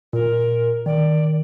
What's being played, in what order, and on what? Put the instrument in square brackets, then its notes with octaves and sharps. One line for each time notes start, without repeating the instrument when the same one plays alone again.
[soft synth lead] A#2 [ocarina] A#4
[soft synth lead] D#3 [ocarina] D5